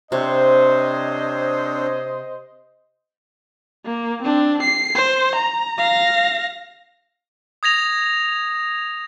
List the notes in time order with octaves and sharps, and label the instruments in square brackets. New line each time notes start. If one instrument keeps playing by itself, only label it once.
[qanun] C3 [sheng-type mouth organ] C4 D4 C#5 [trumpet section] C5 D#5
[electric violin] A#3
C4 D4
C7
C5
A#5
F5 A#6
[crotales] D#6 G#6 A#6 F7